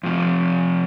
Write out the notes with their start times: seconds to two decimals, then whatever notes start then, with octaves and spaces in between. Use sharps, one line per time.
0.03 F2 C3 F3